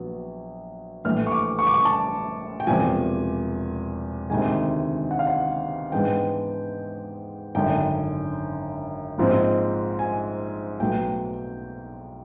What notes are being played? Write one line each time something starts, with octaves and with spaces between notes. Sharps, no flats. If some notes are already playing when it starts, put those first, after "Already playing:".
Already playing: A#1 F#3 B3
A#1 A2 E3 A3 F6
C#6
D6
C#6
D6
C#6
A5
G5
E1 E2 C3 F3 G#5
D2 C3 D#3 G#3 G#5
F#5
F5
F#5
G#2 E3 G#3 B3 D4 G5
G#1 F#2 D3 G5
A#1 G#2 F3 G#3 C4
G#5
B1 A2 F#3 B3 G5